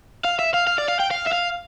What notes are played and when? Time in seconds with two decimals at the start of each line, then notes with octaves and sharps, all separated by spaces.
0.24 F5
0.39 E5
0.54 F5
0.67 F5
0.78 D5
0.88 F5
0.99 G5
1.10 F5
1.26 E5
1.32 F5